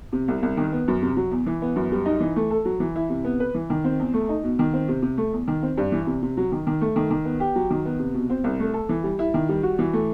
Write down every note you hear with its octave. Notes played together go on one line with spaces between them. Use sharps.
C3
C2
C2
D#3
B3
F#2
C3
F#3
E2
E3
B3
F#2
G3
D#4
E3
A3
A4
F#3
E3
E4
C3
B3
B4
E3
D#3
C4
E2
A3
D#4
B2
D#3
C4
C3
C3
A3
E2
D#3
C4
G2
E3
C3
C3
F#3
D#3
D#3
A3
D#3
D#3
B3
G4
F#3
D#3
B3
C3
B2
C4
C2
A3
A4
E3
G3
E4
D#3
G3
F#4
E3
A3